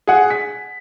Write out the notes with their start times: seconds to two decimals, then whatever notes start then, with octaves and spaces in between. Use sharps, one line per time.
0.07 G#4 F#5
0.30 B6